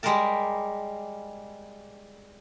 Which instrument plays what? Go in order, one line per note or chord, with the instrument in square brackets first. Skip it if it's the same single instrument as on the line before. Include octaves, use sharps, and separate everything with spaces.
[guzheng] G3 G#3 G4 A#4 A5